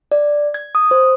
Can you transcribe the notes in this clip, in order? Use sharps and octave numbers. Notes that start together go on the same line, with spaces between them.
D5
G#6
D#6
C5